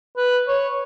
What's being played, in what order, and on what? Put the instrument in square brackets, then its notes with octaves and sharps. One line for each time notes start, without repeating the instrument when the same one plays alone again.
[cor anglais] B4
C#5